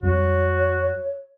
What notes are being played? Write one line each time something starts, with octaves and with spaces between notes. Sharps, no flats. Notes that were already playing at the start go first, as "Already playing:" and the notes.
F2 F#3 G3 F#4 C#5